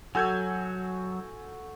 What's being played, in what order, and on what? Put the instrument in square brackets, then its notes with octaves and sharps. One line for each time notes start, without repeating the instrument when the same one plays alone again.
[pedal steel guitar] F#3 [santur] F#4 A4 E6 [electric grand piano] G#5 G6 G#6